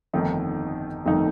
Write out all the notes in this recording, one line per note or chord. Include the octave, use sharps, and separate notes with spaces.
G1 F2 D#3 A3 D#4
G1 F2 D#3 A3 D#4